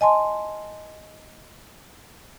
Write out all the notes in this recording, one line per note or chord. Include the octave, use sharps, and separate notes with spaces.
D#5 G#5 A5 C6